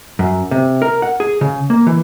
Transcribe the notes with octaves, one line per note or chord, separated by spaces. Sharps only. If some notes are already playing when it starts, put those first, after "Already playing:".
F#2
C3
A#4
F#5
G#4
C#3
A#3
E3